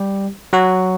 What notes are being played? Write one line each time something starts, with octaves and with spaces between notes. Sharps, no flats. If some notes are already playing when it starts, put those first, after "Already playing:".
Already playing: G3 G4
F#3 F#4